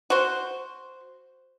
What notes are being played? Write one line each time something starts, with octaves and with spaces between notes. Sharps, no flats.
F#4 C5